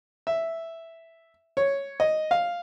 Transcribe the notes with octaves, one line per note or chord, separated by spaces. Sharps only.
E5
C#5
D#5
F5